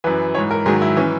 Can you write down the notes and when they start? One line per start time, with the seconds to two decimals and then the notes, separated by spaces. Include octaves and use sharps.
0.04 F#2 E3 B4
0.34 G#2 E3 C#5
0.51 A#4
0.66 G#2 D#3 F#3 G#4
0.82 E4
0.97 E3 C#4